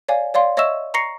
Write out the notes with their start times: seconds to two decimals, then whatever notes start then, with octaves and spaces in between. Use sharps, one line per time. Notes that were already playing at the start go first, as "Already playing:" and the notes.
0.08 C#5 D5 F5 G#5
0.34 C#5 D5 F5 C6
0.57 C#5 D#5 E5 C#6 E6 E7
0.94 A#5 C#6 A#6 C7 C#7